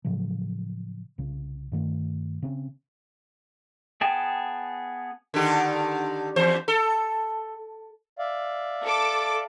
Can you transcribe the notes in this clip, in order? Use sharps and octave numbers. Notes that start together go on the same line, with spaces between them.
A2 C#3 F3 F#3
C2 C#3
G2 D#3 A3
C#3 C4 C#4
B3 G#4 G5 A5
D3 D#3 G4
E2 C5
A4
D5 E5 F5
A4 D6